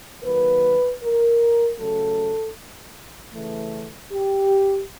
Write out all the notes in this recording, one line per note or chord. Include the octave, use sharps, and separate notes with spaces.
D#3 F#3 A#3 B4
A#4
C#3 F#3 A3 A4
C#3 E3 A3
G4